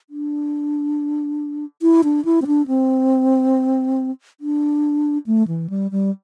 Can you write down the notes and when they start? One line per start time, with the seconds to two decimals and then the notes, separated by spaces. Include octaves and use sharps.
0.10 D4
1.82 E4
2.04 D4
2.25 E4
2.42 C4
2.47 D4
2.68 C4
4.40 D4
5.27 A3
5.48 E3
5.70 G3
5.91 G3